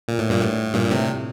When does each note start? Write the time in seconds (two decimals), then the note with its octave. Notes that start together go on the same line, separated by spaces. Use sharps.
0.08 A#2
0.18 A2
0.29 G2 A#2
0.41 A2
0.74 G2 A#2
0.90 A2 C3